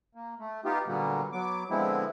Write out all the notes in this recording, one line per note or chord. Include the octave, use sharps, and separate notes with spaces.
A#3
A3
B3 D#4 F4 G4
A#2 D3 F#3 G3 A#3 B3
F#3 B3 D6
D3 F3 G#3 B3 C4 E4